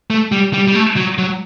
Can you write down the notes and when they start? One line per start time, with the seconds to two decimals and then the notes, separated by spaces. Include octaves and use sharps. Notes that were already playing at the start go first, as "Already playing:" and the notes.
0.10 A3
0.32 G3
0.53 G3
0.68 G3
0.75 A3
0.96 F#3
1.18 F#3